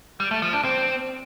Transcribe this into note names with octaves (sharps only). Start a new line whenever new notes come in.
G3
A3
F3
D4
C4